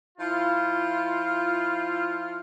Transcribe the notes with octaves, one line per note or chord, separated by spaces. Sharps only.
F3 E4 F4